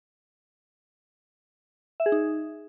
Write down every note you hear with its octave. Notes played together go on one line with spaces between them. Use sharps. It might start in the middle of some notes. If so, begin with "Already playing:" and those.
E5
G#4
D#4